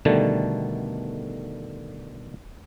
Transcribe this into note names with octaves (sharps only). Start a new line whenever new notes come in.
B2 D3 D#3 G3 A3